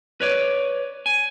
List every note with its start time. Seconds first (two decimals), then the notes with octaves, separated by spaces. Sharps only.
0.21 B4 C#5 D5
1.06 G#5